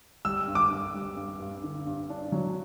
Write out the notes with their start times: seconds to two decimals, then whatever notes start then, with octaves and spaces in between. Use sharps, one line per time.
0.25 G3 E6
0.48 G2
0.55 D6
0.71 G2
0.94 G3
1.17 G2
1.40 G2
1.63 D3
1.87 G2
2.10 D4
2.32 F#3